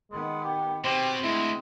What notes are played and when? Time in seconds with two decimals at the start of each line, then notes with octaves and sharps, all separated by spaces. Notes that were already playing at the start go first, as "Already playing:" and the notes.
0.11 D#3 G#3 B3
0.43 G4
0.85 B2 C4 G4 C5
1.24 D2 G#3 E4